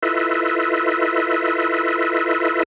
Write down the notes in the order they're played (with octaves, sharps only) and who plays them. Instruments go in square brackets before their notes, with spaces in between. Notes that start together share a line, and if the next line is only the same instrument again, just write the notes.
[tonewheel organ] E4 F4 A4 B4 D#5 E5